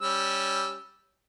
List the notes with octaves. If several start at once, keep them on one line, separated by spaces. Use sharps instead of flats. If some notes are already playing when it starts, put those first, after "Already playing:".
G3 C#4 E6